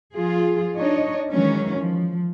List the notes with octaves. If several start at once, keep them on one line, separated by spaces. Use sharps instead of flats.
F3 F4 G#4
D4 D#4 C#5 D#5
D#3 E3 F#3 G#3 C#4
F3